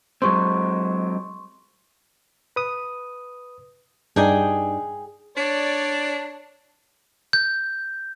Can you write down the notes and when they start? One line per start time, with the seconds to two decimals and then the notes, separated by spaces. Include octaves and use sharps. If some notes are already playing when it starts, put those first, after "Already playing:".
0.22 F#3 G#3 C4 C6 C#6
2.56 B4 D#6
4.16 G2 D4 D#4 G#4 G5 G#5
5.37 D4 C#5 D5
7.33 G6